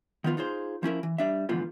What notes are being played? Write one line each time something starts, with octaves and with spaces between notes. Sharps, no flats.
D#3 F3 B3 F4 B4
D#4 F4 G#4 C5
F3 C#4 E4 A#4
E3
G3 D4 E5
G#2 D3 E3 F3 B3 F4